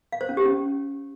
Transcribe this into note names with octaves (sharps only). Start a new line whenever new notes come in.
F5
C5
C#4
G4
C#4